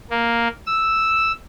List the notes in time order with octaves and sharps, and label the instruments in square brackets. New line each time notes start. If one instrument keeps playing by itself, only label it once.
[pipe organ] A#3
E6